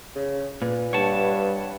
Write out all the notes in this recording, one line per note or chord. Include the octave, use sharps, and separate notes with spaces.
C#3
A#2 B4
G2 C#5 F#5 A5